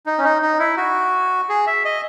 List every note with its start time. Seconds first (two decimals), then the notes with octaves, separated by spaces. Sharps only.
0.06 D#4
0.18 C#4
0.24 D#4
0.42 D#4
0.59 E4
0.77 F#4
1.49 G#4
1.67 E5
1.85 D#5